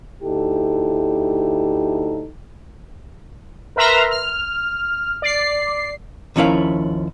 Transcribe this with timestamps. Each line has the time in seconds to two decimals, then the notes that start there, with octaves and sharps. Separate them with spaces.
0.23 D2 D#4 E4 G4 A4
3.76 A#4 B4 E5 A#5 C6 F6
4.11 F6
5.22 D5 C7
6.36 D#2 F3 C#4 E4 A#4 F5